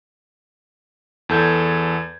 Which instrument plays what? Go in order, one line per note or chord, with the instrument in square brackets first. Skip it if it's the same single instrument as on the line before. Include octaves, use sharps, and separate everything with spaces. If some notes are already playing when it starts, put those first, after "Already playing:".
[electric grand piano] E2 A4 G6 G#6